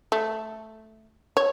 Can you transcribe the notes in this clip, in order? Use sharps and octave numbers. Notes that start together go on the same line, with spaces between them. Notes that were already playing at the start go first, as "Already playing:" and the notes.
A3
C#5